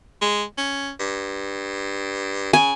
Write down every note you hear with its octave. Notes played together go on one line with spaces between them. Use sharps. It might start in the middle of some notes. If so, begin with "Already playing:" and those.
G#3
C#4
G2
C#3 G#5